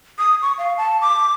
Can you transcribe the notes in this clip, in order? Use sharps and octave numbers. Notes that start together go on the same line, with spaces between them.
D#6
C#6
F5
A5
D6